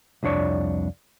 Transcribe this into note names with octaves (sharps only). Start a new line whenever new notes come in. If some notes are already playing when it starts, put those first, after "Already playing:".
C2 F2 D4 C#5 D5